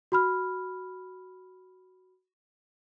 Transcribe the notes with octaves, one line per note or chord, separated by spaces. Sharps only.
F#4 B5 F6